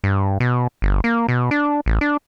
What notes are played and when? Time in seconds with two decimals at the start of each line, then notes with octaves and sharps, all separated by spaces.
0.04 G2
0.40 B2
0.82 G1
1.04 A#3
1.28 B2
1.51 D4
1.86 A1
2.01 D4